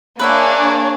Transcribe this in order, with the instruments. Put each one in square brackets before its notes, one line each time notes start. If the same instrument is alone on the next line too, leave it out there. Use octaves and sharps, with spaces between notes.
[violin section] A#3 D4 G#4 [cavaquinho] B4 E5 F#5 [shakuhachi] C#5